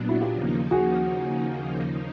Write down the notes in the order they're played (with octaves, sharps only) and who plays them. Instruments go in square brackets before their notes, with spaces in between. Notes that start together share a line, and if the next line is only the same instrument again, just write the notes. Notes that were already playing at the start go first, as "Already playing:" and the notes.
Already playing: [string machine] A#2 F#3 B3 D4
[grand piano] E4 F#4
F4 G4
[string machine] D#2 C#3 F3 A#3 D#4
[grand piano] F#4 G#4